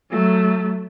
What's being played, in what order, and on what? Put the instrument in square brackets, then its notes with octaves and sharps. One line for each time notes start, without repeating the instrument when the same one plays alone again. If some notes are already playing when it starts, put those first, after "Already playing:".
[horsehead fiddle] F#3 A3